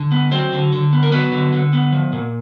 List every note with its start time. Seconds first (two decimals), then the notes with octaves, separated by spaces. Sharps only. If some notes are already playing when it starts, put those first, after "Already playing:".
Already playing: D3
0.12 B3
0.31 F#3 C4 C5
0.52 D3
0.73 D3
0.93 B3
1.03 A#4
1.12 F#3 B3 B4
1.32 D3
1.53 D3
1.73 B3
1.92 F3
2.13 A#2